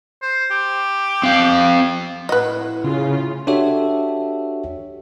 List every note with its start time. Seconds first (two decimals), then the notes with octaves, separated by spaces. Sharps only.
0.22 C5
0.51 G4
1.23 C4 F5
2.29 A2 E4 F#4 B4 D#5
2.84 C#3 F4
3.47 D4 F#4 G4 A4 C#5 E5